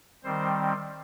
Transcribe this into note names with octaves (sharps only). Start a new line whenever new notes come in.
D#3 G3 C4 C5